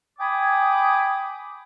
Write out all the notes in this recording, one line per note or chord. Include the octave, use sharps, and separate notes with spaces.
G5 G#5 B5 D6 D#6